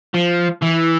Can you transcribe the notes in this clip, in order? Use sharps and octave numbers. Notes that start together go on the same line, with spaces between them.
F3
E3